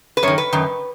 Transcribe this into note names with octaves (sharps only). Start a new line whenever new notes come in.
B4
F#2 D#3 C#5
B4
F#2 D#3